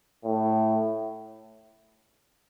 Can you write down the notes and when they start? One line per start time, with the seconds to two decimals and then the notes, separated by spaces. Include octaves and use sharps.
0.24 A2